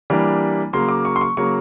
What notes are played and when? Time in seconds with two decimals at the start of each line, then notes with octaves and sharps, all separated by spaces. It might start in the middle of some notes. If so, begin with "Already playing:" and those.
0.10 E3 G3 A#3 D4
0.73 C#3 F#3 A#3 C6
0.89 D6
1.05 C#6
1.16 C6
1.21 C#6
1.37 C#3 F#3 A#3 C#6